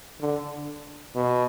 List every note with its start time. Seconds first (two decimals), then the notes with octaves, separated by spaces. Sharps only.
0.21 D3
1.16 B2